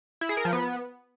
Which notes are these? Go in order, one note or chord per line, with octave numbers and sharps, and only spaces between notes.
E4
G#4
A#4
F3
B3